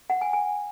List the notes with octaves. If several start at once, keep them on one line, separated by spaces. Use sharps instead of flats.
F#5
G#5
G#5